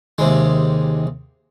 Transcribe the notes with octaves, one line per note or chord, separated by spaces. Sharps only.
D#2 C3 D#3 G#3